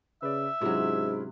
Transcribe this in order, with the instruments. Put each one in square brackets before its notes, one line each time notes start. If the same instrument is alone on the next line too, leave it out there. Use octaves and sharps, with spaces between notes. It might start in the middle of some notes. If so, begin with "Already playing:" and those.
[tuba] C#3 [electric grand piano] B4 D5 [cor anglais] E5
[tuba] G#2 [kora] C3 F#3 [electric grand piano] C#4 E4 F4